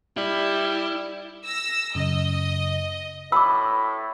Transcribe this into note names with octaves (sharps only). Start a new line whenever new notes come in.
G3 E4
E6 A#6
F#2 C#3 D#5
A2 B5 D6 E6